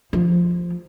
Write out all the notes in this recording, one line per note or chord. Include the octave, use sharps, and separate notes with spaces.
F3